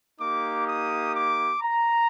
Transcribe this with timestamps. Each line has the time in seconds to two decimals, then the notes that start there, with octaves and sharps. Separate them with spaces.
0.20 A#3 D#4 G4 D6
0.67 D#6
1.14 D6
1.62 A#5